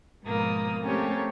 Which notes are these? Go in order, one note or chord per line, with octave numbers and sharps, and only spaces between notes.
G#2 B2 F3 G#3 A#3 D#6
A3 A#3 C4 C#4 G4 C#5